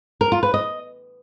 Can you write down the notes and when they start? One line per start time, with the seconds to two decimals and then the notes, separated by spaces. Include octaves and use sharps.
0.21 A#4
0.32 F4
0.43 B4
0.54 D#5